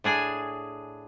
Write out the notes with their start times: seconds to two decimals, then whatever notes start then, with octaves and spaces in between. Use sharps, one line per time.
0.04 A2 D4 G#4 G#5